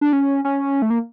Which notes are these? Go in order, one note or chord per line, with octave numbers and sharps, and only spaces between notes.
D4
C#4
C#4
A3
A#3